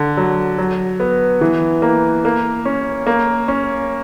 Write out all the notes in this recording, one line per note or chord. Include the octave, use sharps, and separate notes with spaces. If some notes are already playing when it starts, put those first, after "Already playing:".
Already playing: D3
F#3
F#3
B3
E3
A#3
A#3
C#4
A#3
C#4